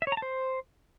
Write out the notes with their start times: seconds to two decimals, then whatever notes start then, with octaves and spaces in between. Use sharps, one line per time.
0.02 E5
0.07 C#5
0.12 A#5
0.17 A5
0.22 C5